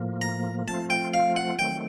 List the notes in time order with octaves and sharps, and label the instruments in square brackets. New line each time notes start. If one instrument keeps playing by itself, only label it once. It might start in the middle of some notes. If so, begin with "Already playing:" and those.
Already playing: [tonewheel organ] A2 F3 A#3
[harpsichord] A#5
[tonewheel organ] F3 A3 C4 F4 [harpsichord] A5
[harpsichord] G5
F5
F#5
[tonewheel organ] D#3 F#3 A3 C4 [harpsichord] G5